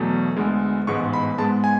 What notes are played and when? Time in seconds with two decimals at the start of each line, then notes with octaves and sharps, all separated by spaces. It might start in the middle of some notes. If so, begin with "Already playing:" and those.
Already playing: E2 B2 F#3 A3
0.36 D2 D3 G#3 B3
0.87 A1 G#2 G#3 B3 C#6
1.13 B5
1.38 G#2 G#3 B3 A5
1.64 G#5